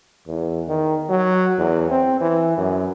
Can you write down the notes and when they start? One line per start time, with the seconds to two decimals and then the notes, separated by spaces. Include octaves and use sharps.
0.27 E2
0.68 D#3
1.10 F#3
1.58 E2
1.91 C4
2.21 E3
2.57 F#2